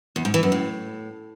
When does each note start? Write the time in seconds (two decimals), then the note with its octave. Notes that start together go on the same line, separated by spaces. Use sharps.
0.16 E2
0.25 G#2
0.34 E3
0.43 F#2
0.52 A2